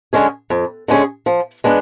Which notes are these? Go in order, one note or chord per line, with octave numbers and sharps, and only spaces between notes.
D3 G#3 C#4 G#4
F2
D3 G#3 C#4 G#4
F3
G#3 B3 D4